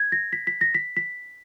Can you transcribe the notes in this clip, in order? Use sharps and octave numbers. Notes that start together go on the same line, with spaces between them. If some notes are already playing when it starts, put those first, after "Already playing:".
Already playing: G#6
A#6
B6
B6
A#6
B6
B6